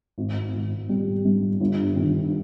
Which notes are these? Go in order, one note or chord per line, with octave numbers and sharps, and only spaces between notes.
G#1
G#1
G3
G2
G1
D#3